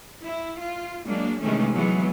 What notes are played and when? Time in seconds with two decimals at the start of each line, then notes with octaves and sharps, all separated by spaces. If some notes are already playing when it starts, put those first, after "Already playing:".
0.24 E4
0.61 F4
1.06 F#3 G#3 A#3 D4
1.41 C3 D#3 E3 G#3 A3 C#4
1.75 E3 F#3 G#3 B3